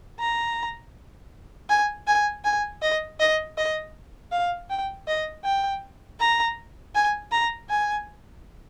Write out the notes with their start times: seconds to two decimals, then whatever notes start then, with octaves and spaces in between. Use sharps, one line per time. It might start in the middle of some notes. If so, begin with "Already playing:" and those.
0.19 A#5
1.70 G#5
2.07 G#5
2.45 G#5
2.82 D#5
3.20 D#5
3.58 D#5
4.32 F5
4.70 G5
5.08 D#5
5.44 G5
6.19 A#5
6.95 G#5
7.32 A#5
7.70 G#5